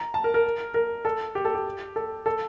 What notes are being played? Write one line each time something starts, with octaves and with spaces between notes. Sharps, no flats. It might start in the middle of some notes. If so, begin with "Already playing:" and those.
Already playing: A#5
A5
A#4
A#4
A#4
A4
G4
A4
G4
A4
A4